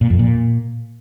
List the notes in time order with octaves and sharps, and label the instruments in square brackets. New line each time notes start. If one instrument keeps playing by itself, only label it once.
[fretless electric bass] A#2
F2
A#2